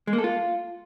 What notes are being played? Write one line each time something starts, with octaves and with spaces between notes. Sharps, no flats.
G#3
A#3
A4
F4